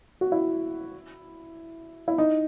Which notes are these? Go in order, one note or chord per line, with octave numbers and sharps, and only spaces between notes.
F#4
E4
E4
D#4